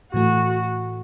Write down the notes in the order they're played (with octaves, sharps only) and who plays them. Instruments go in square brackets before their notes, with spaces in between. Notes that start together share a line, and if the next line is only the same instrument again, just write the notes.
[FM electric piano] A2 E3 A3 [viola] F#4